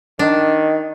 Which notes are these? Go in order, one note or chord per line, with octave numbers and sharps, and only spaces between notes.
D#3 D4 D#5